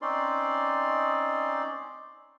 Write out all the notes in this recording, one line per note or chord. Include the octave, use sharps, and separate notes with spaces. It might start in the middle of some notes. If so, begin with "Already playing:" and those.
C4 C#4 D#4 D5 C6